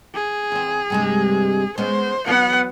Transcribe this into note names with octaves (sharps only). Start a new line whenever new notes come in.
G#4
E2 C4
G2 C3 G#3
G#3 B3 C#4 C5
E2 F#3 B3 F#5